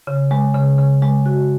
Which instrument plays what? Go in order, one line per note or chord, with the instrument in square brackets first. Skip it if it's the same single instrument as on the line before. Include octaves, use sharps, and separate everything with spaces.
[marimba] C#3
G#3
C#3
C#3
G#3
F#4